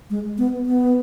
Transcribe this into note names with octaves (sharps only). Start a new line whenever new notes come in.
G#3
B3
B3